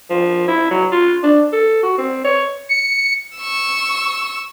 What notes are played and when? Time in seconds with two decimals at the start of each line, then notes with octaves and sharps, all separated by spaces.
0.10 F3
0.48 E4
0.71 F#3
0.92 F4
1.23 D4
1.53 A4
1.83 F#4
1.98 C4
2.25 C#5
2.69 C#7
3.37 C#6 E6